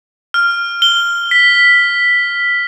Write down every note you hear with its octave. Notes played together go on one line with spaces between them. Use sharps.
F6
G7
B6